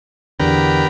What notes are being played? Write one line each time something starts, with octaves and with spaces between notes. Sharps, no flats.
E2 D3 B3 G4 A#4